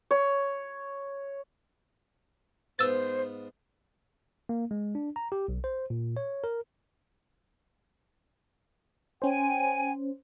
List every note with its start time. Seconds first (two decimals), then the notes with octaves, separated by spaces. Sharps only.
0.11 C#5
2.79 G#2 B3 F4 C5 E6 A6
4.49 A#3
4.71 G#3
4.95 D4
5.16 A#5
5.32 G4
5.48 B1
5.64 C5
5.90 A#2
6.17 C#5
6.44 A#4
9.22 C#4 C5 G5 G#5